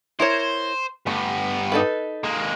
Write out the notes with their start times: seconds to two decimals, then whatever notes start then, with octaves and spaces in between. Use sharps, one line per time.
0.20 E4 A#4 C5 C#5
1.07 G2 A3 B3
1.72 D#4 A4 B4
2.24 G#3 A#3